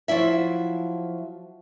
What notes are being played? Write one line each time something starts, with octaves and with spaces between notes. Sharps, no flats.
F3 F#3 E4 E5